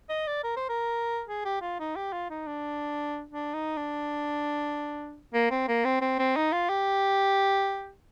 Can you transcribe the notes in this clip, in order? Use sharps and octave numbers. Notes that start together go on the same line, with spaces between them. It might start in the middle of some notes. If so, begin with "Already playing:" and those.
D#5
D5
A#4
C5
A#4
G#4
G4
F4
D#4
G4
F4
D#4
D4
D4
D#4
D4
A#3
C4
A#3
C4
C4
C4
D#4
F4
G4